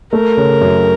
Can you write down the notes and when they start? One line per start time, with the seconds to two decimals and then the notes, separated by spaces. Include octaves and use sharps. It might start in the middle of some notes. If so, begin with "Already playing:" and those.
0.13 A3 A#4
0.37 C#3
0.61 F#2